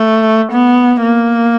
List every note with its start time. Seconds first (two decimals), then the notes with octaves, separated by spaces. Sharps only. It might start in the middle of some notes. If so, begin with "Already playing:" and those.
Already playing: A3
0.52 B3
1.03 A#3